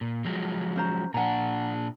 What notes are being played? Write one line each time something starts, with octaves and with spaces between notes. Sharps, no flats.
A#2
F3 F#3 G#3
C#4 C5 A#5
A#2 D4 F#5 G#5 A#5